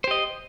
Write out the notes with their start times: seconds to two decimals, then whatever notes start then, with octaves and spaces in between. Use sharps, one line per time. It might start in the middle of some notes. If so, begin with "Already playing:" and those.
0.04 C5
0.08 G4
0.11 D#5